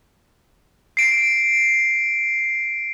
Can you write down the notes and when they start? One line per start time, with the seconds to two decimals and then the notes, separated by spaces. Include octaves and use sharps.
0.97 C7 D7